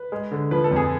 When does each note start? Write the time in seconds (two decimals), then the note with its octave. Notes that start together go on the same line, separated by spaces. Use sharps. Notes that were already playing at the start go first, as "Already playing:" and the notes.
Already playing: B4
0.12 G#3
0.31 D3
0.51 F3 B4
0.64 A4
0.71 F2
0.76 G#4